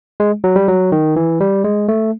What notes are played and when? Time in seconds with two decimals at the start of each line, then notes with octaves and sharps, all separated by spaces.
0.20 G#3
0.44 F#3
0.56 G3
0.68 F#3
0.92 D#3
1.16 E3
1.40 G3
1.64 G#3
1.88 A3